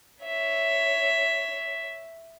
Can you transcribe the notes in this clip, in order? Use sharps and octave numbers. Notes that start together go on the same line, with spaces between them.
C#5 E5